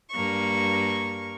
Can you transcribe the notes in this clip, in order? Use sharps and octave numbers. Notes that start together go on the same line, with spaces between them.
G2 A#3 C#6